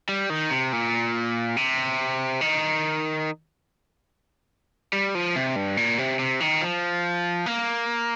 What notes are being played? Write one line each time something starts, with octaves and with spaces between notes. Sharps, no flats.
G3
D#3
C3
A#2
C3
D#3
G3
F3
C3
G2
A#2
C3
C3
D#3
F3
A#3